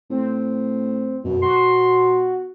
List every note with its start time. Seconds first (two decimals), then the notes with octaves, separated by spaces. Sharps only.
0.10 A2 C4
1.24 F#2 B2
1.43 F#4 C6